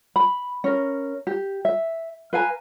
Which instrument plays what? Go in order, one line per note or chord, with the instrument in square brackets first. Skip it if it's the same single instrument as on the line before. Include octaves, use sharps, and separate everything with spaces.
[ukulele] B5
C#4 A#4
G4
E5
B4 F5 G#5 A#5